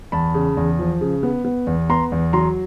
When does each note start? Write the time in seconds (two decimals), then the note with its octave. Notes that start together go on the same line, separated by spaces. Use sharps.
0.12 E2 A5 B5
0.35 C#3
0.57 E2
0.79 F3
1.01 C#3
1.23 B3
1.45 B3
1.67 E2
1.89 B3 A#5 C6
2.12 E2
2.33 F#3 A#5 C6